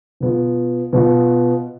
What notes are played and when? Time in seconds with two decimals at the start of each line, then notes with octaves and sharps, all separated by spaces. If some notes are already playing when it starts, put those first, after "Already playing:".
0.20 B2 B3 F4
0.93 B2 B3 F4